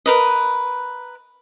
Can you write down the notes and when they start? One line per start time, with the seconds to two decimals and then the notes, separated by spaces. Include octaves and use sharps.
0.06 A#4 B4 D#5